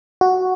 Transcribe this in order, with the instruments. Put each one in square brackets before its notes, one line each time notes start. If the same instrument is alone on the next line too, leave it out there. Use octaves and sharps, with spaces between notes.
[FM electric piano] F#4